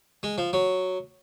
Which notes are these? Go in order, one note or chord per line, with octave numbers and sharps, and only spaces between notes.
G#3
F3
F#3